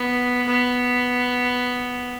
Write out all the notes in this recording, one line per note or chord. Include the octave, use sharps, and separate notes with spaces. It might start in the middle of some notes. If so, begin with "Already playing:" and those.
Already playing: B3
B3